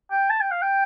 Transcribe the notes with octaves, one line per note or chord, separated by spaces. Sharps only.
G5
A5
G5
F5
G5